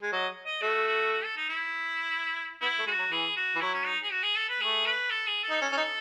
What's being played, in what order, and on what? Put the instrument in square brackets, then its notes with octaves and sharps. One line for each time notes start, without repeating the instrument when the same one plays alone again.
[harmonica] G#3
[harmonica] F#3 [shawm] D#5
[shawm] D#5
[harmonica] A3 [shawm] F#4
[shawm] F#4
F#4
A4
D#4
E4
[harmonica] B3 [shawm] E4
[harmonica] A3
[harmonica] G#3 [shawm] F#4
[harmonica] F#3
[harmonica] E3 [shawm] G#4
[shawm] F#4
[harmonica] E3
[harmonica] F#3 [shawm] E4
[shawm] C#4
D#4
G#4
F#4
G#4
A4
B4
[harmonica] A3 [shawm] G#4
[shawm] B4
A4
G#4
A4
[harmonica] D#4
C#4
C#4
D#4